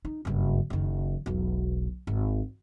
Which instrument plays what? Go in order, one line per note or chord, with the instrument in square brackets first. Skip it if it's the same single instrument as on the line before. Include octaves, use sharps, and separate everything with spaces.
[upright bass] D#4
F#1 G2
F#1 D#3
E1 B1
G#1